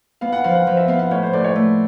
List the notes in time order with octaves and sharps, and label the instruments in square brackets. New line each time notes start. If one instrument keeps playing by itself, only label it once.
[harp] B3 [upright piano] F5
[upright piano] F#5
[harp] F3 [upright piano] F5
[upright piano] F#5
[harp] F3
[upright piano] E5
[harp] B3 [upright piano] F5
[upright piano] F5
[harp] A2 [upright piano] C#5
[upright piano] C5
[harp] A2 [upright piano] D5
[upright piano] C#5
[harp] A3